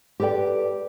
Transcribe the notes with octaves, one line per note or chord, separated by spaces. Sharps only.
G4 A4 B4 D5 G5